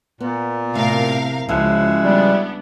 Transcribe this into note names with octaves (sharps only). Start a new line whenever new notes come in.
A#2 B3
A2 C3 A#4 F5
C#2 C#3 F3 G#3 E4 F#4
G3 B3 D4